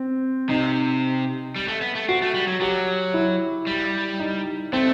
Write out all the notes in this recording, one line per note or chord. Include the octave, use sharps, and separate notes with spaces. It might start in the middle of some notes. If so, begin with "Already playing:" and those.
Already playing: C4
C3 D#4
G3
A3
B3
A3
C4 F#4
A3
G3
F#3
F#3 G4
E4
G3
D#4
A3 C4